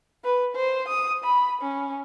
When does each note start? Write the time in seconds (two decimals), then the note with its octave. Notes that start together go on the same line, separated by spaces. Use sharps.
0.24 B4
0.55 C5
0.88 D#6
1.24 B5
1.61 C#4